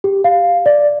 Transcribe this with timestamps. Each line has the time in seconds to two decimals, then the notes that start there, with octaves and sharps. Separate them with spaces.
0.04 G4
0.24 F5
0.66 D5